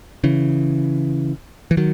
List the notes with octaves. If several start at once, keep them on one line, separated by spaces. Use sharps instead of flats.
C#3 E3
E3
D#3 F#3